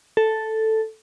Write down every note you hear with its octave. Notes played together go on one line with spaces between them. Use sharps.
A4